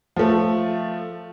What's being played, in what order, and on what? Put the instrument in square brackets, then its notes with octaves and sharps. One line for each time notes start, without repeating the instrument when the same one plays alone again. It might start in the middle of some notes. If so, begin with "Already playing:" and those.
[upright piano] F3 A3